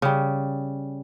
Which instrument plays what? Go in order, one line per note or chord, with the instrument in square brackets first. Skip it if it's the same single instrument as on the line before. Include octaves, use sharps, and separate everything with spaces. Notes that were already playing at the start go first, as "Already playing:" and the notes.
[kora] C#3 G3